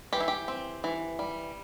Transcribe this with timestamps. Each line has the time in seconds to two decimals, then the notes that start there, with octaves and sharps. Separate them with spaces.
0.13 E3 G4
0.20 E4
0.28 G4
0.48 C4
0.84 E3
1.19 G3